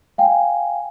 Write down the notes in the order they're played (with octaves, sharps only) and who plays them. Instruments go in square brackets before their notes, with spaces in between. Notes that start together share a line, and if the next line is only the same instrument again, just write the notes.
[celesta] F5 G5 G#5